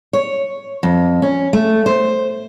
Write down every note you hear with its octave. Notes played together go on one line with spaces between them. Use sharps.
C#5
F2
C#4
A3
C5